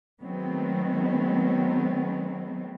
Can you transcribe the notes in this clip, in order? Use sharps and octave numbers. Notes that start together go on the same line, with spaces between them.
D#3 F#3 G#3 A3 B3 C4